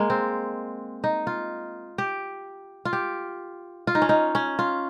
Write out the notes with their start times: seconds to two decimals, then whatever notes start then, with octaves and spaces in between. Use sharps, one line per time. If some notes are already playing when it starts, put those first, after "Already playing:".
Already playing: G#3 A#3
0.10 C4
1.04 D#4
1.27 F4
1.98 G4
2.85 F4
2.93 G4
3.87 F4
3.95 D#4
4.02 C#4
4.09 D#4
4.35 C#4
4.59 F4